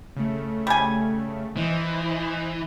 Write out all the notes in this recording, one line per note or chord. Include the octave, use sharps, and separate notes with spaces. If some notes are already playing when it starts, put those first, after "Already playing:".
C#3 A3
G3 G#5
E3 C5 D#5